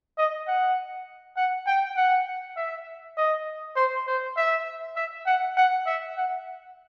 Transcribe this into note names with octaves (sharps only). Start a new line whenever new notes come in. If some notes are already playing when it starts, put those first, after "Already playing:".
D#5
F#5
F#5
G5
F#5
E5
D#5
C5
C5
E5
E5
F#5
F#5
E5
F#5